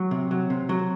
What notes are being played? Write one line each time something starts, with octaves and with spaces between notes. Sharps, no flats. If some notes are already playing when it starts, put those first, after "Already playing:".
Already playing: F#3
C3
F#3
C3
F#3